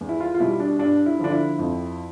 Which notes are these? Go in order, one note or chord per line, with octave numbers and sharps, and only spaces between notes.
E2
E4
F4
F4
B2 G3 E4
D4
G2 D4
E4
D3 F3 D4
E4
F2